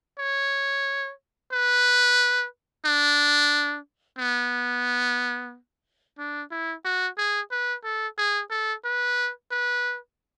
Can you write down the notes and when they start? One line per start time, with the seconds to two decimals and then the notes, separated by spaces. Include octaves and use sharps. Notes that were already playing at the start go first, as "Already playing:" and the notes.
0.19 C#5
1.53 B4
2.85 D4
4.18 B3
6.19 D4
6.51 E4
6.85 F#4
7.18 G#4
7.51 B4
7.84 A4
8.18 G#4
8.50 A4
8.85 B4
9.51 B4